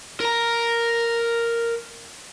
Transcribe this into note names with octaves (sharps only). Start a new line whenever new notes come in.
A#4 A#5